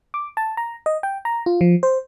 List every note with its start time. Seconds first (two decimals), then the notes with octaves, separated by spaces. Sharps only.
0.14 D6
0.37 A5
0.57 A#5
0.86 D#5
1.03 G5
1.25 A#5
1.46 F4
1.61 F3
1.83 C5